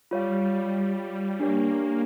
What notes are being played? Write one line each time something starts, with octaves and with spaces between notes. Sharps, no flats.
G3 F4 C#5 F5
G3
G3
G3
A#3 D4 G4 C#5